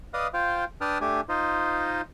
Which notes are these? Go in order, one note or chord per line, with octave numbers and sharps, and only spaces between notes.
B4 D5 D#5 F5 D#6
F4 C5 F5 G5
D4 B4 G5 A5 D#6 F6
A3 D4 G4 G#5
D#4 F4 C5 D#5